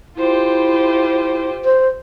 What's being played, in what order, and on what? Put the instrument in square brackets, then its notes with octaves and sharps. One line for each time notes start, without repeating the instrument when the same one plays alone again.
[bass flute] E4 [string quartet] F4 G4 C5
[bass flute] C5